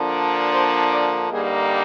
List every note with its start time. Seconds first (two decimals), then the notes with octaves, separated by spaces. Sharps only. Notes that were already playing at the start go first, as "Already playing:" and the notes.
Already playing: D3 F3 A#3 D4
0.50 C5
0.90 D5
1.30 G2 D3 G3 A#3 D#4 G#4